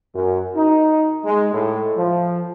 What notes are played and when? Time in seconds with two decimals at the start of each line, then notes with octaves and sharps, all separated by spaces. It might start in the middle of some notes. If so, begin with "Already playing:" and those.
0.15 F#2
0.55 D#4
1.25 G#3
1.53 A2
1.97 F3